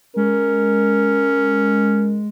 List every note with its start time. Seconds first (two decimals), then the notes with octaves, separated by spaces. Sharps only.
0.16 G#3 C#4 A#4